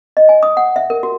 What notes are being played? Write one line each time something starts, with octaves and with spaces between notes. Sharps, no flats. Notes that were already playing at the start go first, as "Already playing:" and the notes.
D#5
G#5
D#6
F#5
E5
A#4
F#4